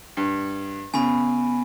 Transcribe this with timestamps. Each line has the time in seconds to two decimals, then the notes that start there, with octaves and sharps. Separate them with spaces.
0.17 G2
0.94 C#3 B3 G#5 B5